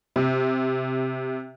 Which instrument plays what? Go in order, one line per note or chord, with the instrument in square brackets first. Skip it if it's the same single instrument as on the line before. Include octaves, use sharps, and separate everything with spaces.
[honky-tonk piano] C3